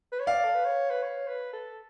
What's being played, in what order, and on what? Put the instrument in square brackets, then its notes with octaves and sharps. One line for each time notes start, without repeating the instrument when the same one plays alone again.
[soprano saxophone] B4
C#5
[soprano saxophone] D5 [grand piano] F5
[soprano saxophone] A4
B4
C#5
B4
C#5
B4
A4